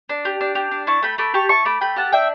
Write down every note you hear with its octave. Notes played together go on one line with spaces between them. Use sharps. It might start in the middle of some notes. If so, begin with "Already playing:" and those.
D4
G4
D4
G4
D4
E4 A5 C#6
A3 G5 B5
A3 B5 D6
G4 A5 C#6
E4 A5 C#6
A3 B5 D6
A3 G5 B5
G4 F#5 A5
D4 E5 G5